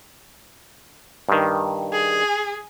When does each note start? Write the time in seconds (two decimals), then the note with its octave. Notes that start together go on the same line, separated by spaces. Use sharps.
1.29 G2 D#3
1.92 G#4